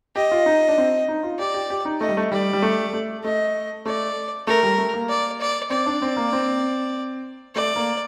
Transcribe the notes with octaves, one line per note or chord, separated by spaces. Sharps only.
G4 D#5
F4
D#4
D4
C4
D#4
F4
G4 D5
G4
G4
D#4
A3 D#5
G3
A3
G3 D5
G3
A3
A3
A3 D#5
A3 D5
A3 A#4
G3
A3
A#3
D5
D5
C4 D5
D4
C4
A#3
C4
A3 D5
A#3